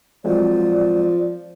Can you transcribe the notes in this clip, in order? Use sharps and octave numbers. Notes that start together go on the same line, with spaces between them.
F3 F#3 G#3 C4 D5